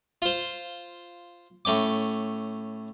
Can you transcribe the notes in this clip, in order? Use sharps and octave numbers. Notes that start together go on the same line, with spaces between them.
F4 C5
A2 C#4 G5 D6